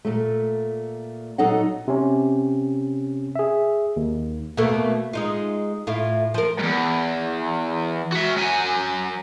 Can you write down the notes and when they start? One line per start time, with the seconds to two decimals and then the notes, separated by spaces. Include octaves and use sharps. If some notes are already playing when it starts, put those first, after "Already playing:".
0.05 A#2 A3
1.38 A#2 F#3 D#4 A4 D#5 F#5
1.88 C3 C#4
3.35 G#4 E5
3.96 D#2
4.57 B2 A3 A#3
5.13 G#3 D#4 F4
5.87 A2 E4 F4
6.34 F3 A#4
6.59 E2 G#2
8.13 F#4 E5
8.37 F#3 G#5